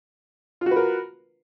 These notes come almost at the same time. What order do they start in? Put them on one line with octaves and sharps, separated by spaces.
F4 F#4 B4 A#4